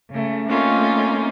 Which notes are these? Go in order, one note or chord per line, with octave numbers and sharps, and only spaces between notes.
C#3 A3
A3 A#3 C4 C#4 D#4 F4